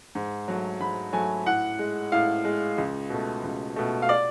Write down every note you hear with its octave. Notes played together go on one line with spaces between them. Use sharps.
G#2
F#3 A3
G#2 B5
F#3 A3 G#5
A2 F#5
G#3
A2 F5
G#3
C#2
B2 A3
C#2
B2 A3
F5
D5